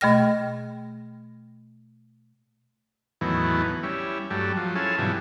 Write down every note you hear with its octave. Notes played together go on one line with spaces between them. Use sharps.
B2 A3 D#5 G5 F6 A#6
E2 A2 D#3 E3 F#3 B3
G3 C#4 E4
G2 F#3 G3 A3
F3 F#3
C#4 E4 F4 G#4 A4
G#2 B2 E3 F#3 G3